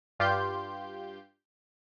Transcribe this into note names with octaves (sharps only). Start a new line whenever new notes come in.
G2 F4 G4 C6 G6